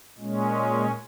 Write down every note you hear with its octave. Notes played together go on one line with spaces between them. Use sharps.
A#2 G#3 C#4